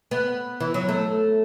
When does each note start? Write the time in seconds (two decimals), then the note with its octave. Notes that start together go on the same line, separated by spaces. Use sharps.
0.11 B3
0.60 E3
0.74 F#3
0.89 A3